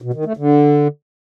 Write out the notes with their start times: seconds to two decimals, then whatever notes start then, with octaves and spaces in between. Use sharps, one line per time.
0.02 B2
0.13 D#3
0.25 A3
0.37 D3